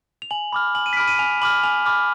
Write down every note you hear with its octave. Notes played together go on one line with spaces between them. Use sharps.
F7
G#5 F#7
B5 D6 F6
G#5 F#7
D#7
B6
B5 D6 F6 D7
D#7
G#5 F7
B5 D6 F6 F#7
G#5 F7
B5 D6 F6